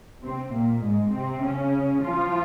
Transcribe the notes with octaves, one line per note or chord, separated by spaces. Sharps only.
C3 C4
A#2 A#3
G#2 G#3
C3 C4
C#3 C#4
F3 F4